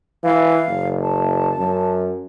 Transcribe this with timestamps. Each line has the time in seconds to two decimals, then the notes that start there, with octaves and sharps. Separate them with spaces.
0.24 E3 F5
0.68 F#1
1.01 A5
1.59 F#2